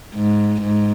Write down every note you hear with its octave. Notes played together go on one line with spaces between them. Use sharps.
G#2
G#2